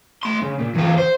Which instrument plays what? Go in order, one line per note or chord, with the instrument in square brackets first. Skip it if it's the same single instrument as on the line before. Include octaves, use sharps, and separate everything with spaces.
[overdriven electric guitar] A3 C6
C#3
A#2
E2 F4
C5